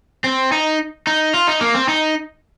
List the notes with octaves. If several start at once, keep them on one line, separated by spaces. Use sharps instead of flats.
C4
D#4
D#4
F4
D#4
A#3
C4
D#4